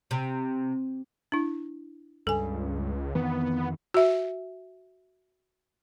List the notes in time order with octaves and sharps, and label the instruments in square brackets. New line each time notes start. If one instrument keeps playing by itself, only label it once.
[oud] C3
[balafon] D4 E4
[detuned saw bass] C#2 [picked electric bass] G2 [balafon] A4 G#5
[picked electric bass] F2 D#3 E3 [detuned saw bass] B3
[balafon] F#4 E5